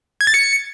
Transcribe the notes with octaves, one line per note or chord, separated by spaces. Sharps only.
G#6
A6
C#7